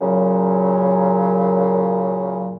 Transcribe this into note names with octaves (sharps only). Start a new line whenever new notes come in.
F#2 A#2 C#3 F#3